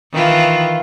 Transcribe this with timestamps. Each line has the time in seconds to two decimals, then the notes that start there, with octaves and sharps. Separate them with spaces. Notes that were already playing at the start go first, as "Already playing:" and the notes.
0.12 D#3 E3 F4